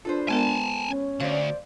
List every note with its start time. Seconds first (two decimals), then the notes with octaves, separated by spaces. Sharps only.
0.05 D4 F4 A4 B4 C5
0.28 G#3 B3 A#4 G#5 A5
0.88 C#4
1.20 D2 C5 D5 F5